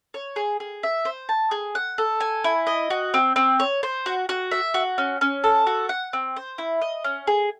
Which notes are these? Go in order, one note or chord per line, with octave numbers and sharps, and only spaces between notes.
C#5
G#4
G#4
E5
C5
A5
G#4
F#5
A4
G#5
E4
D#5
F#4
C4
C4
C#5
C5
F#4
F#4
E5
F#4
C#4
C#4
A4
F#4
F#5
C4
C5
E4
D#5
C#4
G#4